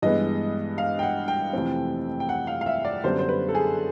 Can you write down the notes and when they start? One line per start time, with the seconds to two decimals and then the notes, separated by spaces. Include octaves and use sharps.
0.02 G2 E3 G#3 B3 D#5
0.78 F5
0.99 G5
1.03 F#5
1.28 G5
1.53 F2 C3 E3 A3 C4
2.20 G5
2.29 F#5
2.47 F5
2.61 F5
2.66 E5
2.85 D5
3.04 F#2 D3 G3 B3 D4 C5
3.19 C5
3.29 B4
3.48 A4
3.55 G#4